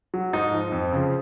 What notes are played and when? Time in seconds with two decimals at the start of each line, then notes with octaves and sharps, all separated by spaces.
0.14 F#3
0.33 G#2 D#4
0.52 F3
0.72 F2
0.92 C#3 F3